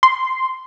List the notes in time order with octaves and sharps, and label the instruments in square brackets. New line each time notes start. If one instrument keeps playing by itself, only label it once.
[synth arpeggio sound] C6